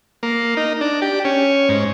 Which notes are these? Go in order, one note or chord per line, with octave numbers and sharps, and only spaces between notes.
A#3
D#4
D4
G4
C#4
G#2